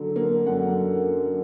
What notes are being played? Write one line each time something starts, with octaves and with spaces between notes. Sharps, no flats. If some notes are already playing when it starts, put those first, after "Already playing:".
Already playing: D3 F#3
A#3
F#2 F#5